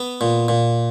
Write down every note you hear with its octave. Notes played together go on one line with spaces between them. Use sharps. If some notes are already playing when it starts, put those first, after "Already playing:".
Already playing: B3
A#2
A#2